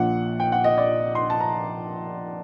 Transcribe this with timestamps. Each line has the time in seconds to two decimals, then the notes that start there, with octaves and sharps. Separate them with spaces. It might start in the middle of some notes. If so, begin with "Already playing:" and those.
Already playing: A#1 A#2 F#5
0.40 G5
0.52 F#5
0.64 D#5
0.78 D5
1.15 C6
1.30 A5
1.40 A#5